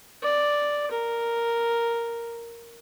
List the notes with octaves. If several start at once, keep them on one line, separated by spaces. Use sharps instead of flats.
D5
A#4